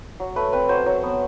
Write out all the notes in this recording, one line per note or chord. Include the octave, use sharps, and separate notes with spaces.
F#3
A3 B4
C4 B4
F#3 C5
F#3
B3